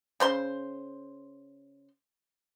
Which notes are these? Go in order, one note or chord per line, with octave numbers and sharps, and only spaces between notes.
C#3 C5 C6